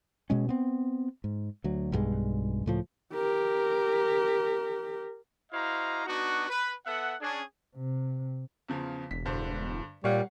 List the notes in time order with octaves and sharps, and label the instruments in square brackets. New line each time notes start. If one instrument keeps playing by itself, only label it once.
[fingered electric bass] B2 G#3 C#4
B3 C4
G#2
D2 F#3
B1 G2 G3 G#3
C#2 A2 F3
[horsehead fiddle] G4 A#4
[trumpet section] E4 F#4 C5 D#5 F5 A#5
B3 D4 D#4 F#4
B4
B3 A4 E5 F#5
C#4 D4 G#4
[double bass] C3
[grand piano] E2 C#3 F3
[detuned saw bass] E1 [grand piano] B6
[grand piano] G2 D3 C5
[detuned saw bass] A#2 [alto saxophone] G3 [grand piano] C#5 F5 F#5